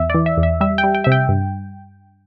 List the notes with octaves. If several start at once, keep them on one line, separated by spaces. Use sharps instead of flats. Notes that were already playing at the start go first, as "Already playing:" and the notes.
Already playing: E2 E5
E3 D5
E5
E2
E5
G3 E5
G5
G3
G5
C3 E5
G5
G2